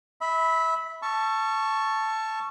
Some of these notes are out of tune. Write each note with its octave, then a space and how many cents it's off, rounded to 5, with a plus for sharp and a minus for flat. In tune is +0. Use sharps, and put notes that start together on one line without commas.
E5 -25 B5 +0
A5 +0 C#6 +0 E6 +40